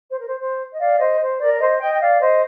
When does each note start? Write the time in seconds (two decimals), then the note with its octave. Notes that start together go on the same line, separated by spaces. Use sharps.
0.08 C5
0.16 A#4
0.24 C5
0.38 C5
0.70 D#5
0.78 D5 F5
0.98 C5 D#5
1.19 C5
1.38 A#4 D5
1.54 D5
1.58 C5 D#5
1.79 D#5 G5
1.92 G5
1.99 D5 F5
2.19 C5 D#5